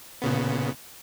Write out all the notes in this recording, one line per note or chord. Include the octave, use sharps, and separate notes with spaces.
A#2 C#3 B3